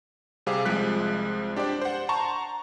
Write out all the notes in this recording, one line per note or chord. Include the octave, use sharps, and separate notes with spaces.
C3 G3 C4 G#4 F5 D6
C2 F3 G#3 F#6 B6
D4 G4 C5 D5
C5 F#5
A5 A#5 C6 C#6